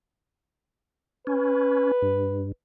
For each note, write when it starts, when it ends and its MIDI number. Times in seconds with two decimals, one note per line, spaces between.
1.27 1.92 61
1.27 2.47 71
2.02 2.52 43